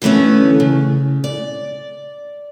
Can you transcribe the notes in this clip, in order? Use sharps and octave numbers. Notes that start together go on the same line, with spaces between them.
D3 E3 A3 B3 C#4
C#3
D5